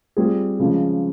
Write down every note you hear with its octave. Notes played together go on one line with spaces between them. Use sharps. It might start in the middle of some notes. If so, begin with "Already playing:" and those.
G3 C4 F4 G#4
C#3 F3 G#3